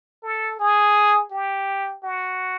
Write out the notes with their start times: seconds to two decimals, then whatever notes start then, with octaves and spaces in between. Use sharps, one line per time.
0.23 A4
0.59 G#4
1.31 G4
2.03 F#4